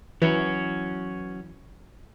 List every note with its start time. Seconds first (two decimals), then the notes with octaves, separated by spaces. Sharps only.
0.22 E3 F#3 C#4 F#4